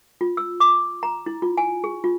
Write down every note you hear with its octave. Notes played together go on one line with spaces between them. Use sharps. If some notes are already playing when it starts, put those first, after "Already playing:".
F4
E6
D6
A#5
E4
F4
G#5
G#4
F4